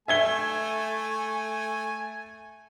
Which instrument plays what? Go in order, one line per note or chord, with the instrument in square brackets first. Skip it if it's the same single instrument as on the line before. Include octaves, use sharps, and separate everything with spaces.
[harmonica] A3 G#5 [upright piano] E5 G#6 G7